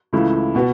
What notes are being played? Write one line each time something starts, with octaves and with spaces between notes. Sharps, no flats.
C#2 C#3 E3 A3 E4
B2 B3 F#4